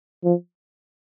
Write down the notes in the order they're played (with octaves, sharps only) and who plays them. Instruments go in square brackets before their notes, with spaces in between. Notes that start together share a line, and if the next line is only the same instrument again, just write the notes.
[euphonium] F3